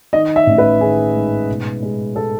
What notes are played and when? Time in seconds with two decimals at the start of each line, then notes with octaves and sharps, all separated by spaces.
0.13 D#3 D#5
0.36 E5
0.47 A1
0.58 B4
0.81 D#3 G#4
1.14 G#2
1.48 B2
1.83 G#3
2.16 A4